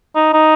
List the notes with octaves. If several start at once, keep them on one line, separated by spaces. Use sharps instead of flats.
D#4
D#4